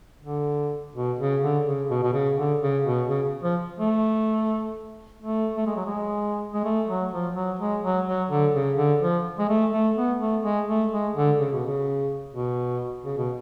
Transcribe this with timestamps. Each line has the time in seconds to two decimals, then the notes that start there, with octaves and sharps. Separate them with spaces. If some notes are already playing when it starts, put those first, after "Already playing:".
0.23 D3
0.95 B2
1.19 C#3
1.42 D3
1.66 C#3
1.90 B2
2.03 B2
2.13 C#3
2.37 D3
2.61 C#3
2.85 B2
3.09 C#3
3.43 F3
3.79 A3
5.22 A3
5.57 A3
5.66 G#3
5.76 F#3
5.86 G#3
6.53 G#3
6.64 A3
6.89 F#3
7.12 F3
7.35 F#3
7.59 G#3
7.83 F#3
8.07 F#3
8.30 D3
8.54 C#3
8.77 D3
9.01 F3
9.39 G#3
9.49 A3
9.72 A3
9.96 B3
10.20 A3
10.43 G#3
10.68 A3
10.92 G#3
11.15 D3
11.39 C#3
11.53 B2
11.66 C#3
12.33 B2
13.05 C#3
13.17 B2